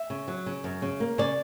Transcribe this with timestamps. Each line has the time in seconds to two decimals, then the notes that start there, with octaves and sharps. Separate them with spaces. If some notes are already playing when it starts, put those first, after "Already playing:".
Already playing: E5
0.10 C#3
0.28 F#3
0.46 C#3
0.64 F#2
0.82 C#3
1.00 A#3
1.18 C#3 D5